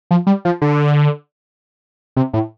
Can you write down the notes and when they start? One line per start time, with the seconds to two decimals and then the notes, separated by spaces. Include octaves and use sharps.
0.11 F3
0.27 G3
0.45 F3
0.62 D3
2.16 C3
2.34 A2